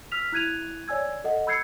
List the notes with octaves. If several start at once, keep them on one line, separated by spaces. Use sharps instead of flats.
E6 F6 B6 F7
E4 F#6 G#6 D#7 F7
C#5 D5 G#5 E6 G#6
A4 D#5 F#5
B5 E6 G6 G#6 C7 C#7